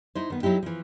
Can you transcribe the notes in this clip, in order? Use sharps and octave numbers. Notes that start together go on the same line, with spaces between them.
D#4 E4 C5
D#3 B3
F#3 D#4 E4 G4
E3 F3